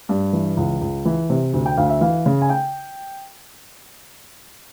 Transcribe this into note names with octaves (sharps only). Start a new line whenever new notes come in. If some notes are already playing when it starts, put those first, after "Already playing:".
G2
E3
C#2
C#2
E3
C3
D2
G5
D2 F5
E5
E3 F5
C#3
G#5
G5